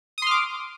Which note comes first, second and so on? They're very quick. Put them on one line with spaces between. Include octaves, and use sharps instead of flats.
D#6 C6 F6 D6